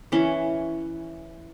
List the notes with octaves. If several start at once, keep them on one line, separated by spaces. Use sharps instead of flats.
E3 C#4